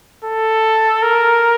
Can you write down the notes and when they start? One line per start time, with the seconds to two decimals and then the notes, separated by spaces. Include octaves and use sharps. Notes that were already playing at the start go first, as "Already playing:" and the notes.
0.24 A4
1.02 A#4